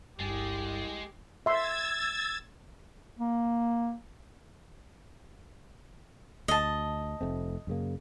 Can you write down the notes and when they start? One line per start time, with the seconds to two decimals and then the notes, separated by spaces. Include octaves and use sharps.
0.20 G1 C2 G2 G#3 G4 A6
1.46 E5 C6 E6 G#6 A6
3.19 A#3
6.48 D2 D#5 A5
7.21 F1 A3 C4
7.67 F#2 C#3 A#3